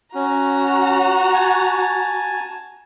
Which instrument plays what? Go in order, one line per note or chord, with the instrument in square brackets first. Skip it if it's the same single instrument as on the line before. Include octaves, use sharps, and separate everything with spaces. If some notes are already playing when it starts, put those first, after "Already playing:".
[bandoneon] C#4 [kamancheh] F#4 A#5
[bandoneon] G#5 A5